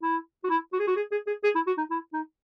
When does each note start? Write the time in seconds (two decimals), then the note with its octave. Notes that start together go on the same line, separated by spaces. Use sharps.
0.03 E4
0.44 F#4
0.50 E4
0.73 F#4
0.79 G#4
0.87 F#4
0.96 G#4
1.11 G#4
1.27 G#4
1.43 G#4
1.55 E4
1.67 F#4
1.78 D#4
1.91 E4
2.13 D#4